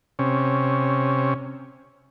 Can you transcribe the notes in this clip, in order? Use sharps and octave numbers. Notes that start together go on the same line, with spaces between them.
C3 C#4